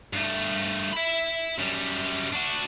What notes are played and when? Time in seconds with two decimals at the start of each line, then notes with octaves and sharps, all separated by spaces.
0.13 G2 A3
0.93 E5 B5
1.58 F#2 G3
2.33 D4 F#4